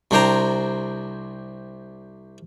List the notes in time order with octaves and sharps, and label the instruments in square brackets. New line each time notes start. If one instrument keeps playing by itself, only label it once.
[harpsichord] C2 C3 D4 C5 G5 A#5